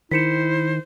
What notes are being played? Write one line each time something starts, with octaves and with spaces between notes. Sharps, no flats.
D#3 E4 C5 B6 C#7 E7